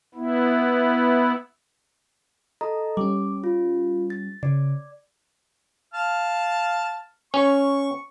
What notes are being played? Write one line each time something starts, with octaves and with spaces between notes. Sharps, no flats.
B3 E4
A4 D#5 A#5
G3 C#4 D6
F4
A6
C#3 D5
F5 A5 F6
C#4 C#6